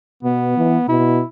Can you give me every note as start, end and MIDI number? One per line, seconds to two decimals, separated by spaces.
0.23 0.55 47
0.23 0.85 59
0.57 0.78 52
0.88 1.21 47
0.88 1.24 64